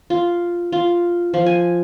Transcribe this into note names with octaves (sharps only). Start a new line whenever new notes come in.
F4
F4
F3
G#5